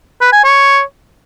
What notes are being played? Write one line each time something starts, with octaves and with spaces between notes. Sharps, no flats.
B4
G#5
C#5